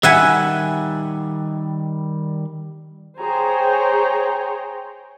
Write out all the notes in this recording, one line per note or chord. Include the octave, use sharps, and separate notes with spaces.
D#3 G3 E5 F#5 G#5
G#4 C5 C#5 G5 A#5